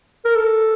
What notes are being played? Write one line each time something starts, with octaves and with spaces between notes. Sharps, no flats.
A#4
A4